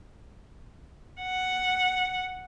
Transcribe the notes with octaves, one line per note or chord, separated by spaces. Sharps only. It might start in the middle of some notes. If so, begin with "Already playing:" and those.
F#5